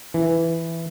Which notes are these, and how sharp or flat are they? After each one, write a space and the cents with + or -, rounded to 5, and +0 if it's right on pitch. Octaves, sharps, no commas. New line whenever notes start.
E3 +5